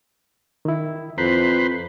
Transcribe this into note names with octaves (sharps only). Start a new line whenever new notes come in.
D#3 E4
F2 B4 C5 A#5